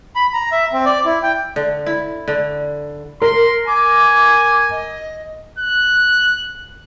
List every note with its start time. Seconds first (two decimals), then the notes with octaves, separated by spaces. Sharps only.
0.16 B5
0.33 A#5
0.52 E5
0.73 C4
0.86 D5
1.05 E4
1.23 G5
1.56 D3
1.86 E4
2.28 D3
3.22 A#4 C6
3.68 G#5 D6
4.71 D#5
5.58 F#6